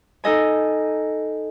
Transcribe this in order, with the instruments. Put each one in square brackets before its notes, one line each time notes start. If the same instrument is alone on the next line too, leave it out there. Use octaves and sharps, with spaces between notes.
[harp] D#4 A4 D#5 G#5